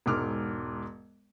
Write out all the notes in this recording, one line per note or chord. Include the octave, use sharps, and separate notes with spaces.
E1 G#2 D6 F6